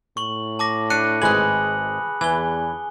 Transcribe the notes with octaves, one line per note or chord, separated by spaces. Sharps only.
A2 C#6 F#7
A5 D6 A#6
D4 F#6 C#7 D#7
G#1 G#3 G#4 B4 G#5 E6 F#6 F#7
E2 E3 G#5 G7